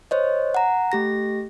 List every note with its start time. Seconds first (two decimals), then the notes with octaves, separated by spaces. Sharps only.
0.11 C5 C#5 D#5
0.54 F#5 A#5
0.92 A3 G4 A#6